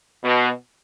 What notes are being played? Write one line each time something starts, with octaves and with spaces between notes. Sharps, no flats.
B2